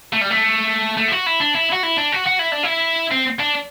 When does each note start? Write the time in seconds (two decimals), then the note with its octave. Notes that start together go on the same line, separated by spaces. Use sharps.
0.13 A3
0.21 G3
0.30 A3
0.97 A3
1.08 E4
1.12 F#4
1.26 E4
1.40 D4
1.55 E4
1.72 F#4
1.83 E4
1.97 D4
2.12 F#4
2.26 F#4
2.39 E4
2.52 D4
2.63 E4
3.11 C4
3.40 D4